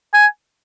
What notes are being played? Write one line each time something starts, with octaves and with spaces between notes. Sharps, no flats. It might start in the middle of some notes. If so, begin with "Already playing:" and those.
G#5